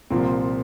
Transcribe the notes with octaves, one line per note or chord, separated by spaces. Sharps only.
C2 A#2 F3 C4